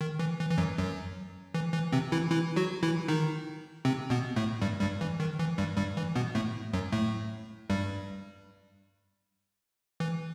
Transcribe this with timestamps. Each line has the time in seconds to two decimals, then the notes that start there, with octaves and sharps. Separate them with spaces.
0.01 D#3
0.19 E3
0.39 E3
0.51 E3
0.58 F#2 F#3
0.78 F#2 F#3
1.54 E3
1.73 E3
1.92 C3 C4
2.12 E3 E4
2.31 E3 E4
2.56 F#3 F#4
2.83 E3 E4
3.08 D#3 D#4
3.85 C3 C4
4.10 B2 B3
4.36 A2 A3
4.62 G2 G3
4.81 G2 G3
5.01 E3
5.20 D#3
5.39 E3
5.58 G2 G3
5.77 G2 G3
5.97 E3
6.15 B2 B3
6.35 A2 A3
6.73 F#2 F#3
6.92 A2 A3
7.70 G2 G3
10.00 E3